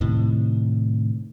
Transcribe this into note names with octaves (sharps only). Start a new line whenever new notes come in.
A2 C3 D#3